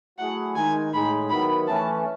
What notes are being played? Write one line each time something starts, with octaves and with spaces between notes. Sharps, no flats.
F#3 A3 E4 G#4 F#5
D#3 G#3 D#4 G#5
A2 G#3 D#4 G#4 B5
D#3 F#3 B3 E4 B5
E3 A3 C#4 A5